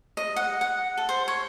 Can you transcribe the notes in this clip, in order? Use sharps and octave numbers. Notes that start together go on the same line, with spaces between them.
D#5
F#5
F#5
A4
C5
C#5